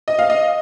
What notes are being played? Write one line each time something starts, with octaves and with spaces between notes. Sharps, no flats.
D#5
F5
D#5